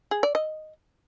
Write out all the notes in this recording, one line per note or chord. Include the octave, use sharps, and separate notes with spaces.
G#4
D5
D#5